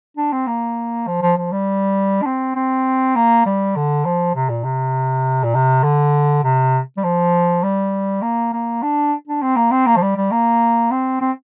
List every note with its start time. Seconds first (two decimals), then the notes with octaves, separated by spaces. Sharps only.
0.17 D4
0.33 C4
0.47 A#3
1.07 F3
1.22 F3
1.37 F3
1.52 G3
2.22 D4
2.26 C4
2.56 C4
3.16 A#3
3.46 G3
3.76 D3
4.05 F3
4.35 C3
4.49 A#2
4.64 C3
5.44 A#2
5.55 C3
5.84 D3
6.44 C3
6.97 G3
7.04 F3
7.63 G3
8.22 A#3
8.53 A#3
8.82 D4
9.28 D4
9.43 C4
9.56 A#3
9.71 C4
9.87 A#3
9.97 F3
10.02 G3
10.17 G3
10.31 A#3
10.91 C4
11.21 C4